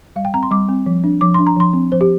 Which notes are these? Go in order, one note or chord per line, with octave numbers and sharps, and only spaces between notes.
G3 F5
G5
C4 A#5
C6
G3 D6
C4
F3
D4
F3 D6
D4 C6
A#5
F3 C6
C4
F3 C5
G4